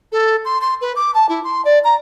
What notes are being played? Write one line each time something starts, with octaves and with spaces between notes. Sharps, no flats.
A4
C6
C6
B4
D6
A5
E4
C6
D5
A#5